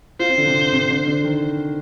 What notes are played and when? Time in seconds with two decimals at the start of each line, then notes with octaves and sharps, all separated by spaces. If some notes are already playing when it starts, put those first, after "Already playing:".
0.20 F4 C5
0.29 C4
0.38 D3
0.47 C3
0.73 C3
0.90 D3
1.07 D3
1.24 D#3